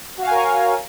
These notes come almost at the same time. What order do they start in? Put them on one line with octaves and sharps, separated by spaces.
F#4 F5 G#5 A#4 C#5